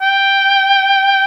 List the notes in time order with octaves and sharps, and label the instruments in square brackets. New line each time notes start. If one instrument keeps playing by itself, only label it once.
[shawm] G5